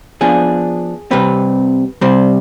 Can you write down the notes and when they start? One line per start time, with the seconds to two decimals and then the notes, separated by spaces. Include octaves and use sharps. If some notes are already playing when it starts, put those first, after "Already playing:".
0.21 F3 B3 D4 G#4
1.11 C3 G3 C4 B4
2.01 C3 G3 C4 C5